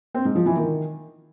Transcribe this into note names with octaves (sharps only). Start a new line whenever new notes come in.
C4
G#2
F3
E3
D#3